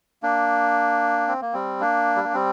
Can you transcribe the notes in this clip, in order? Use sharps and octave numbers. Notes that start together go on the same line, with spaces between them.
A#3 D4
C4
A#3
G3 C4
A#3 D4
G3
A#3
G3 C4